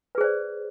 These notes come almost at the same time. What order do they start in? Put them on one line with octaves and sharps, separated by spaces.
B4 G#4 C5 D5